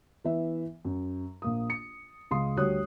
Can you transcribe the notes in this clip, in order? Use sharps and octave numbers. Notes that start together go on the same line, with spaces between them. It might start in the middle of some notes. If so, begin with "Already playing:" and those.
E3 B3 E5
F#2
A#1 A#3 D#6
C#7
C#2 G#3 F5 C6 D#6 C7
D2 G3 F#4 C#5 D#6 F#6